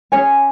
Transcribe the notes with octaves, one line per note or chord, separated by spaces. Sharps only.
C#4 G#4 C#5 G#5